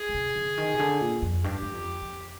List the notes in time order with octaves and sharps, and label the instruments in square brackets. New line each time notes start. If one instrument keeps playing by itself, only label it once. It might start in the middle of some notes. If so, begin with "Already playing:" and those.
Already playing: [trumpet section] G#4
[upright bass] D3
C3
D3
D#3
C3
D3
A#2
F2
[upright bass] G2 [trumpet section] G4
[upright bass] G2
F2
F2